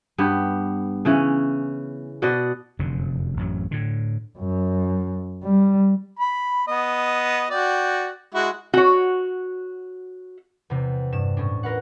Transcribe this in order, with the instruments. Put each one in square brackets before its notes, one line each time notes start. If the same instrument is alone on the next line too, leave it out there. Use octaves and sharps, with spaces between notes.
[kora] G2 B3 G4
C#3 E3 C#4
B2 D5 D#5 F#5
[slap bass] F1 F#2 D3
A1 F#2 F#3
A2 D3
[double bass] F#2
G3
[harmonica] B5
B3 D#5
F#4 D5 G5
G#3 E4 F#4
[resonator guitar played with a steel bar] F#4 C#5
[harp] E2 C3
G2 E7
A2 C#4 D4
F4 A#4 B4 F#5